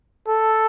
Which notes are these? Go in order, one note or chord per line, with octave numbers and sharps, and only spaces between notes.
A4